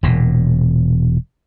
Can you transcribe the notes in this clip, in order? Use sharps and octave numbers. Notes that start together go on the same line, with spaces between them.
E1 A#2